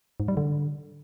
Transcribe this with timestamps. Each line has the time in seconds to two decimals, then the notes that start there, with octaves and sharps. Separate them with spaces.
0.20 G#2
0.28 G3
0.37 D3